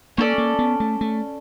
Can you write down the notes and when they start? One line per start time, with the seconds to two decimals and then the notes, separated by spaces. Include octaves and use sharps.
0.17 A#3 C#4 E4 A4 D5
0.38 A#3
0.59 B3
0.80 A3
1.01 A3